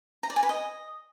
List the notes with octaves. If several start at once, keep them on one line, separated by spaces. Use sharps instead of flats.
A#5
D5
G#5
B4
D#5